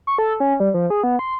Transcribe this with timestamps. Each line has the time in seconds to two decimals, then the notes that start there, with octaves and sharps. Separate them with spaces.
0.07 C#6
0.18 A4
0.40 C#4
0.60 G3
0.74 F3
0.90 G#4
1.04 B3
1.19 C6